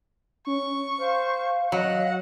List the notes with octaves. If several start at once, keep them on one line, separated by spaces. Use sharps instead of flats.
C#4 C#6
C5 F5
F#3 D#5 F#5